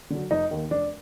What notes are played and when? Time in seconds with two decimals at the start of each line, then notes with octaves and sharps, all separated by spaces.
0.10 D3 F#3
0.31 F1 D#4
0.51 D#2 D#3
0.71 F1 D4